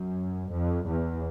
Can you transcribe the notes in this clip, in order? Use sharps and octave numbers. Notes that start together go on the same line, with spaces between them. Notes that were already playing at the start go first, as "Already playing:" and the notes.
Already playing: F#2
F2
E2